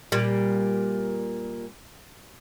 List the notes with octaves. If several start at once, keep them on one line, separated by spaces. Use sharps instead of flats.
A#2 G3